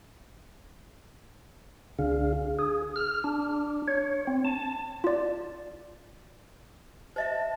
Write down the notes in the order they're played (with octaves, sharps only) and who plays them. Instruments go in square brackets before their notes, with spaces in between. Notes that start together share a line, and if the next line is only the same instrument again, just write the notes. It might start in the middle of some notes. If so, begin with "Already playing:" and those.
[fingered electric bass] C#2 D3 C#4 [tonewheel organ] D4 G#4 F5
[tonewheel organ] G#4
F6
D4
C#5
C4
A5
[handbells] F4 D5
[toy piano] C5 D#5 E5 [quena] A5